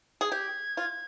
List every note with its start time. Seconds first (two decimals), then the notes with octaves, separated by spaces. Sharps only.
0.21 G#4
0.31 G4 G#6
0.77 F4